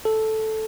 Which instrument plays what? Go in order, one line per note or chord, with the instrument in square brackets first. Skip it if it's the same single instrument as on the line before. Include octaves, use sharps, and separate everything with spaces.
[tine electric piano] A4